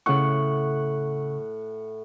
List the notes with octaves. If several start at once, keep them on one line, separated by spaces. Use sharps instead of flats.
A2 C#3 F#5 C#6